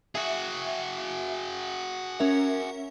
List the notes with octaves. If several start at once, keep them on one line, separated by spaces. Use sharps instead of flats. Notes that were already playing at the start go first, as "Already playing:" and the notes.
F#4 G#4 E5
C#4 A#4 E5